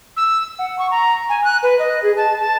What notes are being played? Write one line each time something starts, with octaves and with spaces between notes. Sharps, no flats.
E6
F#5
C#6
A#5
G#5
F#6
B4
D#5
G#4
A5
A5